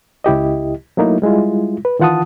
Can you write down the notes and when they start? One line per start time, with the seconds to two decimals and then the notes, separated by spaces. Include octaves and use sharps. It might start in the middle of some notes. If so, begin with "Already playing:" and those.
0.24 C#2 E4 G4 D#5
0.97 F#3 A3 A#3 D#4 E4
1.22 G3 G#3 E4 F4
1.85 B4
1.99 D#3 E3 F4 F#5 A5 D#6